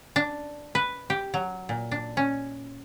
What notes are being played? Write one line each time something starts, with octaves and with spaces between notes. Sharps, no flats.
D4
B4
G4
F#3
A#2
D4
C#4